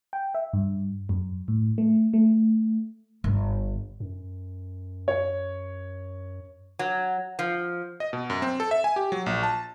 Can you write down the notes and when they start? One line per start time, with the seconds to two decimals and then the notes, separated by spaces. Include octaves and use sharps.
0.13 G5
0.35 E5
0.53 G2
1.09 F#2
1.48 A2
1.78 A3
2.13 A3
3.24 G1
4.00 F#2
5.08 C#5
6.79 F#3
7.39 F3
8.00 D#5
8.13 B2
8.30 F#2
8.42 C4
8.60 A4
8.71 E5
8.84 G#5
8.96 G4
9.12 F#3
9.26 A#1
9.43 A5